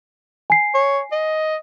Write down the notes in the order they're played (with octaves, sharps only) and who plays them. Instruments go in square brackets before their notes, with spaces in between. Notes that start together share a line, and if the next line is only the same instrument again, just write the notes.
[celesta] G#5 C7
[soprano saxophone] C#5
D#5